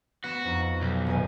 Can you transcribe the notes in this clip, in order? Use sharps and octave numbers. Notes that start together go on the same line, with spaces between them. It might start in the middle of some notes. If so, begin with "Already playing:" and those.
B3 F#4 B5 E7
F2 D#4
B1 G6
D#1 A#4 G#5